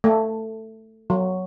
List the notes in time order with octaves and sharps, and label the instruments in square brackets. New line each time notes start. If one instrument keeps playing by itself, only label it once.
[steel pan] A3
F#3